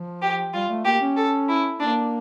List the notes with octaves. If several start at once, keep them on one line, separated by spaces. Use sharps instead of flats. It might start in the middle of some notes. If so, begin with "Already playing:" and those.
Already playing: F3
G4
G3 F4
A3
A#3 G4
C#4
A4
E4
A#3 D4